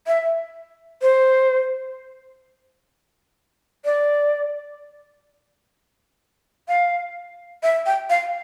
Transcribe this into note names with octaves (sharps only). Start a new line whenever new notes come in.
E5
C5
D5
F5
E5
G5
F5